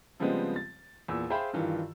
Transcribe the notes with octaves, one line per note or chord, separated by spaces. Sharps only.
C#3 F3 G3 G#3 B3 C4
A6
E2 A#2 E6
G#4 C5 E5 F5 G5 B5
G2 D#3 E3 F4